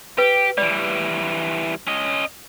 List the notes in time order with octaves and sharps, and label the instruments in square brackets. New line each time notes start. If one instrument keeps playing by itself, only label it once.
[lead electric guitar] G4 [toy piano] B4
[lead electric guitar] E3 G3 [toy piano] D5
[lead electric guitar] C#4 D#5